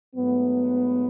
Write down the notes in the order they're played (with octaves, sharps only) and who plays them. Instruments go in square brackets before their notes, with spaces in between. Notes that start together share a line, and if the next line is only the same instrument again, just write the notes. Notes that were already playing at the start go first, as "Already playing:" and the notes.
[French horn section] G#2 F#3 A3 B3